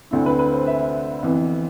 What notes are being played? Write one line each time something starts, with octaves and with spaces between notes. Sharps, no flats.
D2 D3 A3 C4 E4
B4
B4
C5
E5
F2 E3 B3